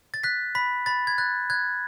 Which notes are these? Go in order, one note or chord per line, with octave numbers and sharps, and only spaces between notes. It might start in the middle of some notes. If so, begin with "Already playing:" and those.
A6
F#6 B6
B5 B6
B5 A6
G#6
F#6 A6
F#6 G#6